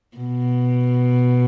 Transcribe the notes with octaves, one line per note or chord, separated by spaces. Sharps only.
B2